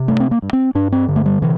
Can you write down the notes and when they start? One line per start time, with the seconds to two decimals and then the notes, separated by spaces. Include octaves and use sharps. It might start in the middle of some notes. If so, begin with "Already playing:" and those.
Already playing: C3
0.08 G2 A3
0.20 C4
0.31 A#3
0.42 G2
0.53 C4
0.75 G2 D4
0.92 C4
1.08 D3
1.16 A3
1.26 G3
1.42 C3 E3